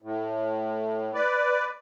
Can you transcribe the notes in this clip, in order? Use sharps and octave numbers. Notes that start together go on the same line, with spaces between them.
A2
B4 D5